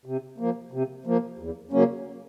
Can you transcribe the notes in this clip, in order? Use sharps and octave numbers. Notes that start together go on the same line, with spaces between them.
C3
F3 A#3
C3
F3 A#3
E2
C#3 F#3 A#3 C#4